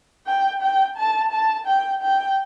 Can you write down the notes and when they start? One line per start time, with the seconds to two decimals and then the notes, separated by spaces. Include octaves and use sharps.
0.27 G5
0.62 G5
0.97 A5
1.32 A5
1.67 G5
2.02 G5